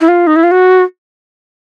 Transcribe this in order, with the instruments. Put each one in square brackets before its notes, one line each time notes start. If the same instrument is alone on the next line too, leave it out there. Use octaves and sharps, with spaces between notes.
[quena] E4
F4
D#4
E4
F4
F#4